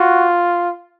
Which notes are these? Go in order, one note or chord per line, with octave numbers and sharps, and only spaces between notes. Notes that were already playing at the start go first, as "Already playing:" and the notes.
Already playing: F4 F#4